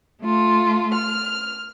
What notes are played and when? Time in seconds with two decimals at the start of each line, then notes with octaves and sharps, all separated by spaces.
0.21 A3 F4
0.93 F6